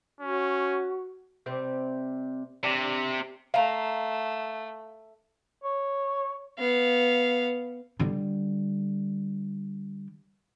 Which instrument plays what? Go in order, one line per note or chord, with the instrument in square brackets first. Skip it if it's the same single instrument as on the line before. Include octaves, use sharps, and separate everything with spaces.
[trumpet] C#4 [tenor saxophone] F#4
[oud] C3 G3 C4
[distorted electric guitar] C3 [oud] D4
[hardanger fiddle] A3 [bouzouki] F5 A#5
[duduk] C#5
[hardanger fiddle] B3 F5
[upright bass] D3 G3